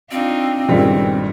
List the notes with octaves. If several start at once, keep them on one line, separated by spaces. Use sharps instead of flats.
C4 D4 D#4 F4
G#1 G2 A#2 C#3 G3